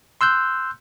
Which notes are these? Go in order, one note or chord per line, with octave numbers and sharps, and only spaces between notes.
C6 E6 F#6 G6